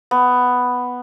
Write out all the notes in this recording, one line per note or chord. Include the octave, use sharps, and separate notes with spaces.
B3